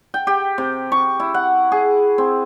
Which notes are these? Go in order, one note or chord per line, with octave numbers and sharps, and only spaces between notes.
G5
G4
C3
C#6
E4
F#5
G#4
C4